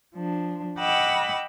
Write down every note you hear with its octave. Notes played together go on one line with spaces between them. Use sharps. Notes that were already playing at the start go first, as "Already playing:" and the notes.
F3 D4
D#5 F#5 G5 B5 D6 E6